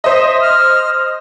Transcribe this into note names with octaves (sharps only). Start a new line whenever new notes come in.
C5 D#5 E5
F6